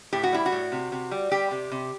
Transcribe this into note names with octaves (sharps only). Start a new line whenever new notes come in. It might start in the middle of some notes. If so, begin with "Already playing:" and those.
A2 G4
F#4
G3 E4
F#4
A2
C3
C3
G3
G3 G4
C3
C3